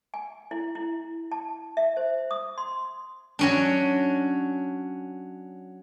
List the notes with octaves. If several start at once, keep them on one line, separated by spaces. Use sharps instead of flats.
G#5
E4
E4
A5
E5
C5
D#6
C6
F#3 C#4 D4